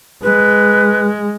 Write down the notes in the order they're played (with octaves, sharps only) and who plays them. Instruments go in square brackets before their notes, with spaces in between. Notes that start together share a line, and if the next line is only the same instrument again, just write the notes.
[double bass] G#3 [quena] B4